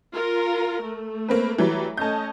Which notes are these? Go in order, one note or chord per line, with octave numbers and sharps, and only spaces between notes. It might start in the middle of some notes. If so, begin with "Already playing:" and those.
F4 A#4
A3
A#3 C4 B4
E3 F#3 G3
A3 C#4 D#5 A5 G6